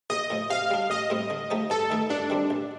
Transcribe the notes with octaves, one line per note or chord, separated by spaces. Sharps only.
A#1 D#5
A2 F3
C3 F5
G3 D4
A1 D#5
A2 G3 C4
D3
F3 A3 D#4 G4
G2 A4
D#3 A3 D#4 A#4
G2 D4
D#3 G3 C4
A1